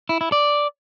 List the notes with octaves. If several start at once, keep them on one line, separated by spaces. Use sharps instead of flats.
E4
E4
D5